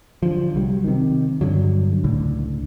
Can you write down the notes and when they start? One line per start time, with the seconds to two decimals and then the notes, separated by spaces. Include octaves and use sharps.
0.23 D3 F3
0.55 C2 F#3 G3
0.84 C3 D#3
1.41 G2 D3 F#3
2.04 C#2 A2 D3